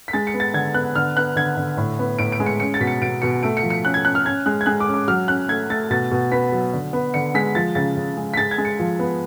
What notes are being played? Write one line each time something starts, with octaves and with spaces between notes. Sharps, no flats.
B6
G#3 A6
C#7
B3
A6
D3 G#6
B3 F#6
D3 F6
B3 F#6
D3 G#6
D3
A2
B3
A2 D7
D7
G#3
C#7
C#4 C#7
A6
B2 B6
C#7
B2 D7
B2 C#7
A3 D7
C#7
F3
C#7
C#4 F#6
G#6
C#4 F#6
F6
C#4 G#6
G#3 F#6
G#6
G#3 F#6
D6
C#4
D6
F#3 F6
C#4 F#6
A3 G#6
A3 A6
B2 A6
B2
B3 B6
F#3
D3
B3
D3 C#7
G#3 B6
F3 A6
C#3 A6
C#3
G#3
B6
G#3 A6
G#6
G#3
C#7
F3
B3